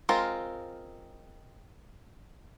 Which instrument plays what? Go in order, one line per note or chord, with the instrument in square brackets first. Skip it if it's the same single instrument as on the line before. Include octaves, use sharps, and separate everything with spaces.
[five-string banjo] G#3 C4 F4 A#4